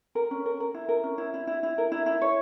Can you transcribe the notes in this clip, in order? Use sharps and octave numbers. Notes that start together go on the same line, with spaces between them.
A#4
C#4
A#4
A#4
E4
A#4
C#4
E4
E4
E4
E4
A#4
E4
E4
C#5